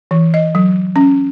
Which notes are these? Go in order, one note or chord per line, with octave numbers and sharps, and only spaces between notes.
E3
D#5
F#3
C#4